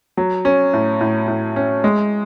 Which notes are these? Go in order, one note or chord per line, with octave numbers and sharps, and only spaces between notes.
F#3
C#4
A2
A2
A2
C#4
G#3